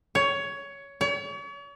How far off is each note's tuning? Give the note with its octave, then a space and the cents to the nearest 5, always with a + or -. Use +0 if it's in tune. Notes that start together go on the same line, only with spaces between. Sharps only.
C#5 +15
C#5 +40